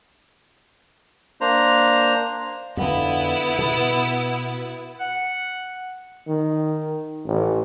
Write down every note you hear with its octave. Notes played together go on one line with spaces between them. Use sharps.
A#3 D4 C5 A#5
F2 D3 B3 E4
B2
F#5
D#3
A1